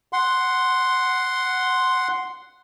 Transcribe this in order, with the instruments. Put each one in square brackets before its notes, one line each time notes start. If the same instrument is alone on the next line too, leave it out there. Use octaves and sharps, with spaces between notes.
[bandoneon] F#5 C6